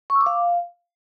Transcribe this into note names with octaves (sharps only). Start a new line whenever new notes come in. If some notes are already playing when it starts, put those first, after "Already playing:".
C#6
E6
D6
F5